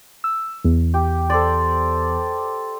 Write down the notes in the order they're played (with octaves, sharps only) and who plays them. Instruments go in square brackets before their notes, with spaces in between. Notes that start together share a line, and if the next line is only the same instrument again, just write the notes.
[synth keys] E6
E2
[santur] G4
A4 C5 D5